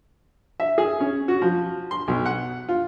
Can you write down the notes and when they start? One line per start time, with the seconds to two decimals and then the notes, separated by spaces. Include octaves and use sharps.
0.60 E5
0.78 G#4
1.00 C#4
1.28 F#4
1.42 F3
1.91 C6
2.08 B1
2.25 F#5
2.69 F4